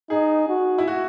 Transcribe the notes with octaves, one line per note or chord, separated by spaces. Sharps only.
D#4 G#4
F#4
E4
F#4